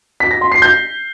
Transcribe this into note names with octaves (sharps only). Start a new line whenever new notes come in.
B6
A#6
C6
C7
G6